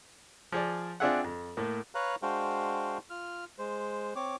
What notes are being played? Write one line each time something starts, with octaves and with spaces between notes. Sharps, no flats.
F3 G#4 D5
C4 D4 F4 G#4 E5 F#5
F2
A2 A3 A#3
B4 C#5 F5 A#5 F#6
G#3 D4 F#4 C5 F5 G5
F4 F6
G#3 C5
C4 C#5 D6